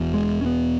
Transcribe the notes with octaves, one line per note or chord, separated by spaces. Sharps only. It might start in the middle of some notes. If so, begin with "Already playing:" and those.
Already playing: E1 E2 B2
G#3
C#4
B3